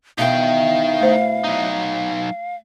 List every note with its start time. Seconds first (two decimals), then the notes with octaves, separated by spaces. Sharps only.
0.18 B2 D#4 E4 F5 G5
1.01 A3 C5
1.44 F#3 D#4